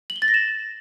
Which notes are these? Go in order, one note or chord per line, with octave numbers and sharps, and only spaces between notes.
F#7
G7
A6
A#6
E7